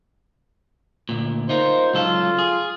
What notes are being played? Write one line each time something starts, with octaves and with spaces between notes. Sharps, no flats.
D2 A#2
D#4 F4 A#4 C5
C#2 F#3 F4 A4
G#4